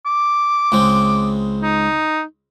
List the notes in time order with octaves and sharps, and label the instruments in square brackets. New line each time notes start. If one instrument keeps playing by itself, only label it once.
[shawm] D6
[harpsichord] C#2 G#3 C4
[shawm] D#4